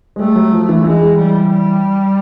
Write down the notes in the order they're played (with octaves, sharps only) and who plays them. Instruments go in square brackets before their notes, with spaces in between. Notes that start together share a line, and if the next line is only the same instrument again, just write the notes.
[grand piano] G#3
[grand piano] G3 [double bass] A3
[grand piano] F#3
F3
E3
[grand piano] E3 [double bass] G#3
[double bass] G3
G3